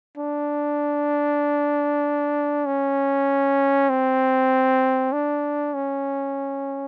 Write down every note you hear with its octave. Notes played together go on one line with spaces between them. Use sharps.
D4
C#4
C4
D4
C#4